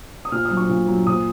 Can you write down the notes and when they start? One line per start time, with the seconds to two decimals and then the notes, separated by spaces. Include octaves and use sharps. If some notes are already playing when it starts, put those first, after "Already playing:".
0.25 D#6
0.32 A#2 F6
0.45 D#6
0.51 F#3
0.57 C#6
0.69 A#2
0.88 F#3
1.07 A#2 D#6